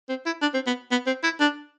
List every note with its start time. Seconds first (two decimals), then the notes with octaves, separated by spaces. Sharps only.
0.09 C4
0.26 E4
0.42 D4
0.54 C4
0.67 B3
0.91 B3
1.07 C4
1.24 E4
1.40 D4